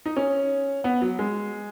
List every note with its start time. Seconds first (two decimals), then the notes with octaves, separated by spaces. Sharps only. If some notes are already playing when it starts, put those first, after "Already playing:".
0.06 D#4
0.17 C#4
0.84 B3
1.02 F#3
1.19 G#3